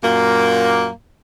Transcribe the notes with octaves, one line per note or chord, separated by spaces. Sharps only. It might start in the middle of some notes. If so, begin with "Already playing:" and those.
F#2 A#2 A#3